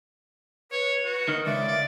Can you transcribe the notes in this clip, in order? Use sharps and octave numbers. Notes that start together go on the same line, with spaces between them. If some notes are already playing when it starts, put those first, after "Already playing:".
B4 C#5
F#4
D#3
C#2 D5 E5
D5